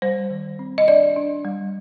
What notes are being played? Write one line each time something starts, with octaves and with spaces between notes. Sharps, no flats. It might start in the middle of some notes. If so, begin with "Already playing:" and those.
G3 C5
D#3
C4
D#5
D4 D5
D4
G3